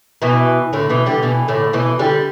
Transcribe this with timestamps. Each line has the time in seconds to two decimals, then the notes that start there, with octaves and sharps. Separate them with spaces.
0.22 B2 E3
0.73 A2 D3
0.89 B2 E3
1.06 D3 G3
1.23 B2 E3
1.48 A2 D3
1.73 B2 E3
1.99 D3 G3